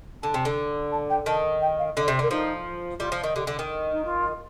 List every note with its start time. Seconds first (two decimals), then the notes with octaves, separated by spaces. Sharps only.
0.23 D3 A5
0.34 C3
0.45 D3
0.92 A5
1.10 G5
1.26 D#3 A5
1.61 G5
1.79 F5
1.96 D3 D#5
2.05 D5
2.08 C3
2.19 D3 A#4
2.31 F3 D#4
3.00 G3 F4
3.12 F3
3.24 D#3
3.35 D3 G4
3.47 D3
3.59 D#3
3.92 D#4
4.05 F4